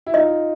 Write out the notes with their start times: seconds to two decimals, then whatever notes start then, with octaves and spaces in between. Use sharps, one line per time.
0.06 E4
0.14 D#4 F4 D#5